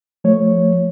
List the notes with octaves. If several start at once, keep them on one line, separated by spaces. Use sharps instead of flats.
F3 A3 C#5